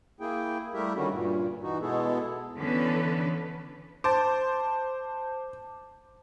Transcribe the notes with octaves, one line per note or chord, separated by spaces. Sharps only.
A#3 E4 G#4 G5
G3 A3 E4 G4 A#4 E5
D3 D#3 G3 C#4 F#4
G2 A#2
E3 D#4 F#4
B2 G#3 B3 E4 G#4 A4
D3 E3 B3 C#4 B4
C5 A5 D6